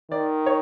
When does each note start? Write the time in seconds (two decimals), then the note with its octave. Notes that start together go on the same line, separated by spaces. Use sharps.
0.11 D#3 D5
0.46 C#5